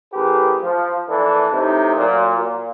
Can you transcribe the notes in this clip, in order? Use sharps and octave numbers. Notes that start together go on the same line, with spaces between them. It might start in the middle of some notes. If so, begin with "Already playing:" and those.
A1 G4 G#4 A#4 B4
F3
A#1 E3 D4 A4
A2 C3 D#4
A#2 F#3
A#2